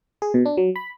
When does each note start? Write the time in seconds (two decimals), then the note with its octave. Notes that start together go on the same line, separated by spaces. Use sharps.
0.22 G#4
0.34 B2
0.45 D4
0.57 F#3
0.76 B5